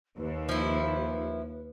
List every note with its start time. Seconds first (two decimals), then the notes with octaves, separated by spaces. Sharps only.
0.18 D#2 B4
0.49 F3 E4